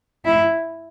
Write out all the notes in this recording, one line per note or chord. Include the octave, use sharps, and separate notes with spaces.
E4